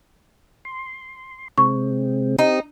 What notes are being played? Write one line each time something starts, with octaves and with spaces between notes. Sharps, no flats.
C6
C3 G#3 C4 C#6
C4 D#4 G4